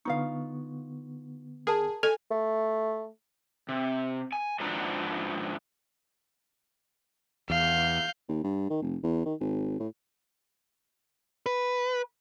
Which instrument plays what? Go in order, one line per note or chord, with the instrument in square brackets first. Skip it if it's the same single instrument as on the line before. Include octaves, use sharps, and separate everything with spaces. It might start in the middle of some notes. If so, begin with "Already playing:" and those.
[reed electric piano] D3 B3 C#6 [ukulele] D#4 F4 F5
[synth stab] G#4 [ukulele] A#4 A5
[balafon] A4 [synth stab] G#5
[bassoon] A3
[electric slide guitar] C3
G#5
G#2 F3 D4 F#4 B4 A#5
[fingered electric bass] E2 [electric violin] F5 G6
[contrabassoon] D#2
G2
D#3
F1
E2
D#3
G#1
A2
[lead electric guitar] B4